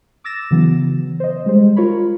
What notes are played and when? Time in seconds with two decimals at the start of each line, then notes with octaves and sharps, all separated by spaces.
0.24 D6 E6 A6 A#6 E7
0.51 C#3 E3 F#3 B3
1.20 C5 D#5
1.46 G3 G#3 C5
1.76 F4 A#4 C#5 B5